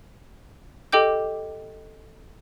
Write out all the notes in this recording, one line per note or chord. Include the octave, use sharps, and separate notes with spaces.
G4 A4 D#5 G5 D6 G6